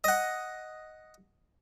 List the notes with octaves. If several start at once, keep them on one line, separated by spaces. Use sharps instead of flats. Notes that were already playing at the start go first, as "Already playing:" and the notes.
D#5 F#5